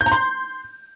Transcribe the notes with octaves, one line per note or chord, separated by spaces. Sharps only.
G6
A#5
C6